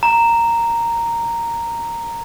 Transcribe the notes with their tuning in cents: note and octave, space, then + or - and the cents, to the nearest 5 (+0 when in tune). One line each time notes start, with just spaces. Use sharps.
A#5 -5